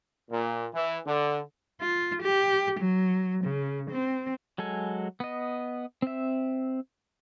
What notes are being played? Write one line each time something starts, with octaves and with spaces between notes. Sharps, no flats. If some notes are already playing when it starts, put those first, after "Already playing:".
A#2
E3
D3
F4
G4
F#3
C#3
C4
F#3 G#3 A4 G#5
B3 D#5
C4 E5